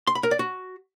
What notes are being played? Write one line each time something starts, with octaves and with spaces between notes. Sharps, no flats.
C6
B5
A#4
D5
F#4